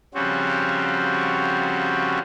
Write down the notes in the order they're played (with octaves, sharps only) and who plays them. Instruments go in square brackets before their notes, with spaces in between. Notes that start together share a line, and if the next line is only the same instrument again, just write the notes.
[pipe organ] C#3 F3 G3 C4 C#4 F#4